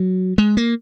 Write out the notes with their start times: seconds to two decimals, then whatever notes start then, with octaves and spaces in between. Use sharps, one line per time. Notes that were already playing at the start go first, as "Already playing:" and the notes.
Already playing: F#3
0.38 G#3
0.57 A#3